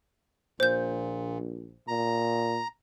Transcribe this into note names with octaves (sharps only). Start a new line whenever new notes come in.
A#1 A#2 C5 G6
A#2 A#5